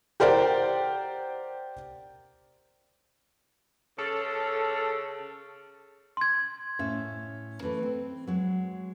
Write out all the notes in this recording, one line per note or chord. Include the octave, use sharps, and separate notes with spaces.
G4 A#4 C5 D5 F#5 G5
C#3 A4
C6 G#6
A2 C#4 E5
E3 A3 B4
C4
F#3 G#3